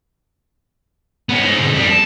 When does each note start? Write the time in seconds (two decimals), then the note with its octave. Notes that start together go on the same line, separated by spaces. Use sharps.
1.29 B3 C#4
1.44 D#4 C5
1.59 B2 D3
1.72 F2 G3
1.90 A5